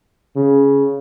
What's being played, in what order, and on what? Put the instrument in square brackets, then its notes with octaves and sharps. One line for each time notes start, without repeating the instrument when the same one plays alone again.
[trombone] C#3